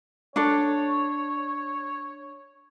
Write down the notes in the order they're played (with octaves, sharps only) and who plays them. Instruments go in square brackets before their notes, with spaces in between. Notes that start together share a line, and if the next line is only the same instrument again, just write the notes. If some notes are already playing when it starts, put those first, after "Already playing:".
[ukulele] D4 A4 [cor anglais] C#5